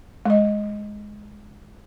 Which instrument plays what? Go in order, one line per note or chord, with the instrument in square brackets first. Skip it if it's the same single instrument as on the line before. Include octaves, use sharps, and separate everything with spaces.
[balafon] G#3 D#5